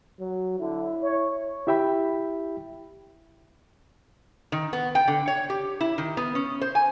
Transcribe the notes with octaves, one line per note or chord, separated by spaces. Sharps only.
F#3
D3 E4
C#5
E4 G4 E5 G5 B5
D#3
B3
G5
D3
C#5
G4
E4
D#3
B3
C#4
C5
G#5